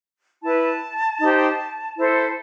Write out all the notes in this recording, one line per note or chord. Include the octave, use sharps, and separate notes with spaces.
E4 B4 A5
D#4 G4 C5
E4 A4 C5